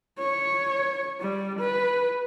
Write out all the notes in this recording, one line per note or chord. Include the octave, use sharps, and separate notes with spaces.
C#5
G3
B4